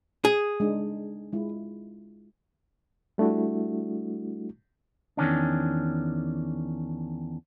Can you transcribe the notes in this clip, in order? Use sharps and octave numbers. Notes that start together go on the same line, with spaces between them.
G#4
G#3 D4 D#4
G#3 E4 F4
G3 A3 D4 E4 F#4
E2 D#3 C#4 D4